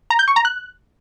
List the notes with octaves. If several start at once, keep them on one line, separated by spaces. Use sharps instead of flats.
A#5
G6
C#6
A#5
F#6